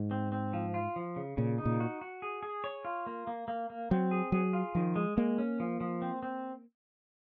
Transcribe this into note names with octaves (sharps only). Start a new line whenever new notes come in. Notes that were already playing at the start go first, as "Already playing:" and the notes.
Already playing: G#2
C4
C4
F3
F4
F3
C#3
A#2 C#3
D#4
A#2
F#4
F#4
G#4
G#4
C#5
F4
A#3
A#3
A#3
A#3
F#3 C4
G#4
F#3 G#4
F4
D#3 F3
G#3
G#3 A#3
C#4
F3
F3
C4
C4